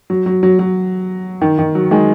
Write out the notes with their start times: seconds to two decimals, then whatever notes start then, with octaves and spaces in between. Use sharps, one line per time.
0.10 F#3
0.26 F#3
0.43 F#3
0.59 F#3
1.41 D#3
1.59 D#3
1.75 F#3
1.91 D#3 G#3